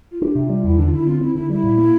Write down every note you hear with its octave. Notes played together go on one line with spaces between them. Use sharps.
F4
D4 G4
C3
F4
G3
E2 E4
D3 D4
F4
D3 E4
C4 F4
C4 E4
D3 E4
G3 E4
A#2
A#3